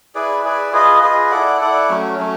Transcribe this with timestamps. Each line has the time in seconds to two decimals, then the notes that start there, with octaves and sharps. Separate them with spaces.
0.15 E4 G#4 B4 D5
0.44 E4 G#4 B4 D5
0.72 F4 G#4 B4 D#5
1.02 F4 G#4 B4 D#5
1.31 E4 A4 D5 F#5
1.61 E4 A4 D5 F#5
1.90 F#3 A3 C#4
2.18 F#3 A3 C#4